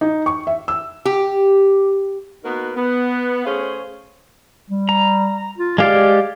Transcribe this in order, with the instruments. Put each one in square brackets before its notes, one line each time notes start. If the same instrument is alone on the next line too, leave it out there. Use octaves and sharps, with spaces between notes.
[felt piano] D#4
C#6
E5
E6
[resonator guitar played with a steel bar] G4
[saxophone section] A#3 B3 D#4 F#4 A#4 B4
B3
A3 C#4 G#4 C5 C#5 F5
[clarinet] G3
[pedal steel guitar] A#5
[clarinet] F4
[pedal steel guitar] G#3 G4 D5 [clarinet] F5